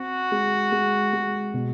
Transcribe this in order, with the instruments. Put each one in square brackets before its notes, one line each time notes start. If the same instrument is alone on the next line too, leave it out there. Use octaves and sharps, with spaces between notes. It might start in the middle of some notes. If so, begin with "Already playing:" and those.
Already playing: [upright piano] C4 [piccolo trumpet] F#4
[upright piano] G#3
G#3
G#3
B2